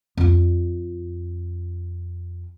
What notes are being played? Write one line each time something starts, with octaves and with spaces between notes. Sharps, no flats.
F2 F4